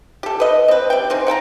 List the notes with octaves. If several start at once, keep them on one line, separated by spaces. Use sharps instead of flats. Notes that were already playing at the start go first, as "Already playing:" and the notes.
G4 A4
B4 D#5
C4 B4
G3 G5
G#3 C4 D#4
F#5 G5 A5 A#5